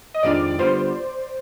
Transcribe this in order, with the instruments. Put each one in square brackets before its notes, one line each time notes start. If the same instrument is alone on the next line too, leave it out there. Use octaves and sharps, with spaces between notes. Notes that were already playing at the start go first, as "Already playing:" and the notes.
[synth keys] D#5
[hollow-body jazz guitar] F2 D#3 G#3 D4 F4 [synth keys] D5
[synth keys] D5
[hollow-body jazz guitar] D3 G3 B3 F4 [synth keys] C5